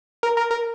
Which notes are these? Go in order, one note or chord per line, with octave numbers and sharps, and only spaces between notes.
A#4
A#4
A#4